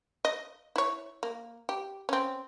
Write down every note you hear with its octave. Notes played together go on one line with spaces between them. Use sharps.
D#5
E4 C#5
A#3
G4
C4 C#4